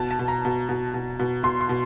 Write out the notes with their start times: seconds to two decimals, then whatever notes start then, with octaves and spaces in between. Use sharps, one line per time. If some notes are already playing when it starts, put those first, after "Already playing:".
Already playing: B2 A5
0.11 A5
0.19 B2
0.28 A#5
0.45 B2
0.69 B2
0.94 B2
1.19 B2
1.43 B2 C6
1.61 C6
1.69 B2